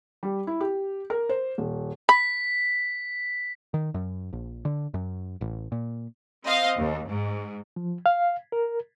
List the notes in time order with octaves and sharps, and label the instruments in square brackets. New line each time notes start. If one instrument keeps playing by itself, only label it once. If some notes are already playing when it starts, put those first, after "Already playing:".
[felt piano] G3
E4
G4
A#4
C5
D#1
[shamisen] B5 [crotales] B6
[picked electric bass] D#3
F#2
A#1
D3
F#2
A1
A#2
[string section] C4 D#5 F5
D#2
G#2
[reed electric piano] F3
F5
A#4